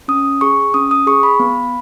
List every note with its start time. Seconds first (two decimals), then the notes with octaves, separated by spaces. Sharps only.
0.08 C#4 D#6
0.41 G#4 C#6
0.74 C#4 D#6
0.91 D#6
1.07 G#4 C#6
1.23 B5
1.40 B3